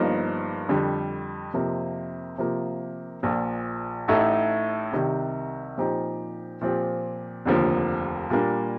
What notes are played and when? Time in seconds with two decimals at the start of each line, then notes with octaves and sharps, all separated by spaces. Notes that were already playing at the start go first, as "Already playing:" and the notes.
Already playing: G1 G2 F3 A#3 D#4
0.69 F2 D3 G3
1.53 F2 C3 F3 A#3
2.38 C3 F3 A#3
3.23 A#1 A#2 F3
4.08 A1 A2 A3 D#4 A4
4.92 C2 C3 D#3
5.77 A#2 F3 C4 D#4 G4
6.61 A#2 F3 C4 G4
7.45 F1 D#2 D3 F3 A#3
8.30 A#2 G3 A#3 D4